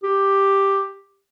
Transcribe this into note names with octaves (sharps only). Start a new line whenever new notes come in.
G4